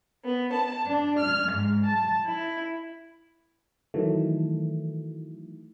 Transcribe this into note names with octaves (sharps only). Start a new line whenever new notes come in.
B3
A5
D4
F6
G#2
A5
E4
D#3 E3 F#3 A3